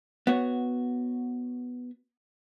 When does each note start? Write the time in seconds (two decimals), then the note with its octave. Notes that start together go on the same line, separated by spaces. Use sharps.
0.27 B3 F#4 C#5